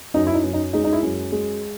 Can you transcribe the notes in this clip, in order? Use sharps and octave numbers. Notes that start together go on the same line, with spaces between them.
F#2 D#4
E4
D#4
F#2
D#4
G#3 D#4
D#4
E4
F#2
G#3